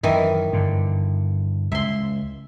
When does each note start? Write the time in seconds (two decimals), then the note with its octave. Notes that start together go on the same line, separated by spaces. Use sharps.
0.03 F#2 D#3 E3 E5
0.53 G2 D3
1.72 C#2 E5 C6